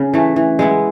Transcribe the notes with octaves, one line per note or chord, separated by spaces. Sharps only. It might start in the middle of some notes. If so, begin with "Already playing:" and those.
Already playing: C#3
E3 A3
E3
G#3 B3 E4